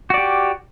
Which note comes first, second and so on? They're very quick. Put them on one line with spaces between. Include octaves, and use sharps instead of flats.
F#4 D5 G4